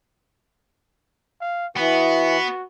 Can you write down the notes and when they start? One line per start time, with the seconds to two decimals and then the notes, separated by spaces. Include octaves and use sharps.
1.41 F5
1.77 E3 B3 F#4